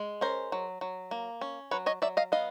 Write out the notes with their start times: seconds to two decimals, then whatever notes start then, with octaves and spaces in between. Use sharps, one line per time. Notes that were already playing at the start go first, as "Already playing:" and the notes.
Already playing: G#3
0.21 C#4 A#4 C5
0.52 F#3
0.81 F#3
1.11 A#3
1.41 C#4
1.71 F#3 B4 C#5
1.86 C#5 D#5
2.02 F#3 D5 E5
2.17 D#5 F5
2.32 B3 D#5 F5